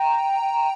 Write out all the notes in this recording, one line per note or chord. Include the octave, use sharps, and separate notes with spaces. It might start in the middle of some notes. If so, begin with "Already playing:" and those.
Already playing: G5 A#5